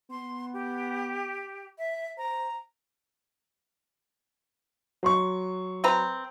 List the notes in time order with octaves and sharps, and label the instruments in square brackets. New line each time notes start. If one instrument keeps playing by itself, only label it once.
[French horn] B3 [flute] C6
[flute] G4
E5
[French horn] C5 [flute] A#5
[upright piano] F#3 C6 C#6
[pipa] C4 B4 A#5